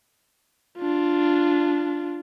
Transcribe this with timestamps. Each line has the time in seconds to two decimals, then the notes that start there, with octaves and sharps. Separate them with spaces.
0.78 D4 F4